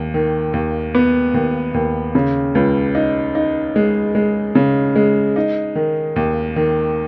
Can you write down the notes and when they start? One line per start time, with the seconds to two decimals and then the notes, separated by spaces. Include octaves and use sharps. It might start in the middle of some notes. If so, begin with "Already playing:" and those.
Already playing: D#2
0.14 D#3
0.53 D#2
0.95 B3
1.34 D#2
1.74 D#2
2.15 C#3
2.55 C#2
2.95 D#4
3.35 D#4
3.76 G#3
4.15 G#3
4.55 C#3
4.96 G#3
5.36 D#4
5.75 D#3
6.16 D#2
6.56 D#3